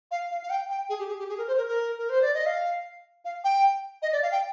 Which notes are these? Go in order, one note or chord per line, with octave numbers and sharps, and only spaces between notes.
F5
F5
F5
G5
G5
G#4
G4
G#4
G4
G#4
A#4
C5
A#4
A#4
A#4
C5
D5
D#5
F5
F5
G5
D#5
D5
F5
G5